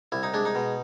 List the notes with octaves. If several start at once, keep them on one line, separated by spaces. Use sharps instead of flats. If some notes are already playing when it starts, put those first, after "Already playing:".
C2 E4
D#4
G#3 D4
D#4
B2